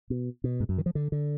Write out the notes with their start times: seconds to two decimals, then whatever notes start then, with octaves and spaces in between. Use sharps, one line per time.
0.10 B2
0.44 B2
0.60 G#2
0.69 F#2
0.78 D#3
0.86 F3
0.95 D3
1.12 D3